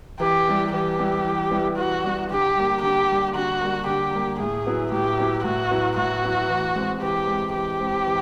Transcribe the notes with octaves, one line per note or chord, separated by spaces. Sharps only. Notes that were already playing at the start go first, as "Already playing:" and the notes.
E3 G4
G3 B3 E4
E3 G4
G3 B3 E4
E3
G3 B3 E4
E3 F#4
G3 B3 E4
D3 G4
G3 A#3
D3 G4
G3 A#3
D3 F#4
G3 A#3
D3 G4
G3 A#3
A2 G#4
F#3 B3 E4
A2 G4
F#3 B3 E4
A2 F#4
F#3 B3 E4
A2 F#4
F#3 B3 E4
E3
G#3 C4
E3 G4
G#3 C4
E3 G4
G#3 C4
E3